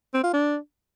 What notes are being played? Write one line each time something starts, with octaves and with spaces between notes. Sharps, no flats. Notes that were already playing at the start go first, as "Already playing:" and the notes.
C4
F4
D4